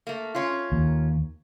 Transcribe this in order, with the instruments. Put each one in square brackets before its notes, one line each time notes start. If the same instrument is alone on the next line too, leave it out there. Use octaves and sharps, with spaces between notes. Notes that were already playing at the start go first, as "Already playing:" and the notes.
[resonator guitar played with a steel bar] A3 A#3
C#4 F4
[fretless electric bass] D#2